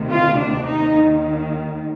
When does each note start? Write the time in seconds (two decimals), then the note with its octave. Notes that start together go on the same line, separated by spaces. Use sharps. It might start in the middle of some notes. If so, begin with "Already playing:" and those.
Already playing: D2 C3 D#3
0.10 F4
0.39 D4
0.68 D#2 D#3 D#4